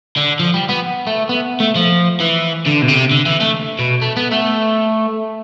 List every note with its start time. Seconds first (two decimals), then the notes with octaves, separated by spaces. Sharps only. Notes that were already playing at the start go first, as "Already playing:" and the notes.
0.17 D3
0.40 F3
0.54 G3
0.69 B3
1.07 A3
1.29 B3
1.60 A3
1.76 F3
2.20 E3
2.66 D3
2.82 B2
2.88 C3
3.11 D3
3.26 E3
3.41 A3
3.79 B2
4.02 A3
4.17 B3
4.32 A3